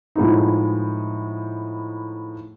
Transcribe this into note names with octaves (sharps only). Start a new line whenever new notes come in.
A2 F3 G#3 B3 D#4